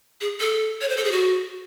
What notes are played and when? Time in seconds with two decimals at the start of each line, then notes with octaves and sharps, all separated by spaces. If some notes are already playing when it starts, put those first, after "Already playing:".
0.21 G#4
0.40 A4
0.81 C#5
0.89 C5
0.97 A4
1.04 G#4
1.12 F#4